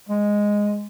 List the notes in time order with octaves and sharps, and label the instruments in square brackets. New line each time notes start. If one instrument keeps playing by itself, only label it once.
[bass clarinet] G#3